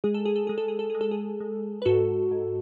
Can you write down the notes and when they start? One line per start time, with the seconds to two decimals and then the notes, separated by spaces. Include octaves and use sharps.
0.04 G#3 G#4
0.14 A4
0.25 G#4
0.36 A4
0.47 G#3 G#4
0.58 A4
0.68 G#4
0.79 A4
0.90 G#3 G#4
1.01 A4
1.11 G#4
1.40 G#3
1.82 B4
1.85 G#2 F#4 A4
2.31 G#2